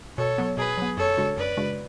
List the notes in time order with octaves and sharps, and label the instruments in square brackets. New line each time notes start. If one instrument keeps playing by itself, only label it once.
[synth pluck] B2 [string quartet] A4 C#5
[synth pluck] F#3 B3
[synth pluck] B2 [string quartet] G#4 B4
[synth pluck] F#3 B3
[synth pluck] F#2 [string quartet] A4 C#5
[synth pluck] C#3 G#3 D4 F#4
[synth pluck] F#2 [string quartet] B4 D5
[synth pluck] C#3 G#3 D4 F#4